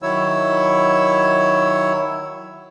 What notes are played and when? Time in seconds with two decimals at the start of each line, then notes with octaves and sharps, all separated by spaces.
0.02 D#3 F#3 E4 C#5 E6